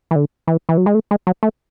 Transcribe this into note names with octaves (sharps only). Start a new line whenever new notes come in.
E3
D3
E3
E3
F#3
G#3
A3
G#3
F#3
A3